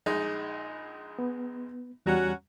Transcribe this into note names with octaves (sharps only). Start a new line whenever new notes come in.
A#1 G#3 D#4
B3
E2 G3 C#4 F#4 A#5